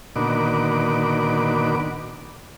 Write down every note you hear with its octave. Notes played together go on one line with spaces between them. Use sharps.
A#2 D3 D#3 B3 F#4 D6